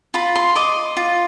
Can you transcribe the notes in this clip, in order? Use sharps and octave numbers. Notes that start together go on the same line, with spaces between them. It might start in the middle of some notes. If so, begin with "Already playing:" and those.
F4 B5
C6
D#5 D6
F4